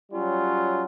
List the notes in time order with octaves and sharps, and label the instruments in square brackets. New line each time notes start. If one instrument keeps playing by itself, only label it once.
[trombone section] F#3 G3 C#4 F4